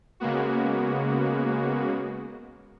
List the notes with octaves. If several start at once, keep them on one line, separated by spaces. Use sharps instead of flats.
C#3 G#3 A#3 B3 F#4